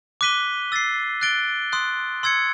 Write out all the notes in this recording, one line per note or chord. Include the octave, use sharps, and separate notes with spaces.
D6 F#6 B6 D#7 G7
E6 A6 C7
F#6 A6 D7 G7
C6 D#6 F#6
C6 E6 G#6 C#7